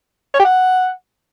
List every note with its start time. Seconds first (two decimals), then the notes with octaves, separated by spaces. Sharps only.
0.34 C#5
0.39 G4
0.45 F#5